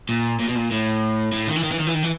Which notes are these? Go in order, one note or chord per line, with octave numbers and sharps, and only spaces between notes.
A#2
A#2
B2
A#2
A2
A2
D#3
E3
D#3
E3
D#3
E3
D#3
E3